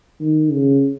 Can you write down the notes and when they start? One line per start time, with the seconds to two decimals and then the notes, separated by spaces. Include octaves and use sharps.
0.21 D#3
0.51 C#3